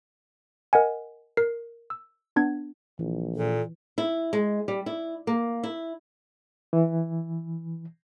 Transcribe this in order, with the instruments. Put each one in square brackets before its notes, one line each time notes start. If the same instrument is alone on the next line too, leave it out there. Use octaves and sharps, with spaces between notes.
[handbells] A#4 D#5 F#5 G#5
A#4 C7
E6
B3 D4 G#6
[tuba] A#1 [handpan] E3
[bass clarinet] A#2 [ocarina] A4
[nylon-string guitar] E4
G#3
G3
E4
A#3
E4
[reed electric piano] E3